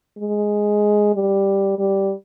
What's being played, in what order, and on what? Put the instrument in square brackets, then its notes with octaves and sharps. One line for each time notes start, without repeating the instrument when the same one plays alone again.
[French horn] G#3
G3
G3